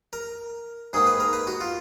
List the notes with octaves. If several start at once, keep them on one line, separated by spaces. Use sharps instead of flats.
A#4
G#2 D#3 A#3 G#4
B4
A#4
B4
F#4
F4